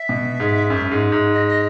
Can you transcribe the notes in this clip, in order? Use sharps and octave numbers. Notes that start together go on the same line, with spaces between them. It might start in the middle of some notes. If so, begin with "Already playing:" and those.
Already playing: E5
B2
G#2
F#2
G#2
G#2
D#5
D#5